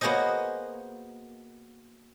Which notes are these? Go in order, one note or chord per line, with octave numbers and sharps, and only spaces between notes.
A#3 B3 F#4 G#4 C5 D#5